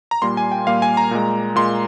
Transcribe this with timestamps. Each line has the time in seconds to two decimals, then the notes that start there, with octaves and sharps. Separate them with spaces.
0.11 A#5
0.22 A#2 G3 A#3 C6
0.37 G#5
0.52 G5
0.67 A#2 G3 A#3 F5
0.82 G#5
0.97 A#5
1.11 A#2 G#3
1.56 A#2 G#3 C6